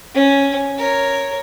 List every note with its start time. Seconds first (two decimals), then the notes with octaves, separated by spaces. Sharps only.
0.14 C#4
0.78 A#4 C#5